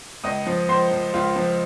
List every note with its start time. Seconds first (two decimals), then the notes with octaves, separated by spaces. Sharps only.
0.24 C#2 D#5 D#6
0.47 F3
0.68 C#2 C5 C6
0.91 F3
1.14 C#2 F4 F5
1.36 F3